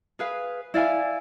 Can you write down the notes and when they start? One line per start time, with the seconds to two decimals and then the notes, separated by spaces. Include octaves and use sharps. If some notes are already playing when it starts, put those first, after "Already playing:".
0.19 G#4 B4 F5
0.74 E4 D5 F5 G#5